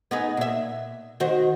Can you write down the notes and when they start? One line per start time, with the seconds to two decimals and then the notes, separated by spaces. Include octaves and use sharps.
0.11 B3 D#4 G#4
0.37 A#2 E5
1.20 D#3 F#4 C5